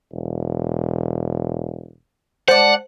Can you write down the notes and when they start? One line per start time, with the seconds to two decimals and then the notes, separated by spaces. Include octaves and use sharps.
0.12 E1
2.48 G#3 C5 D5 F#5 A5